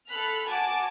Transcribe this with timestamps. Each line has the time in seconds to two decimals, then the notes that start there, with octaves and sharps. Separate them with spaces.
0.10 A4 B5 F6 F#6
0.47 F#4 G#5 A5 D6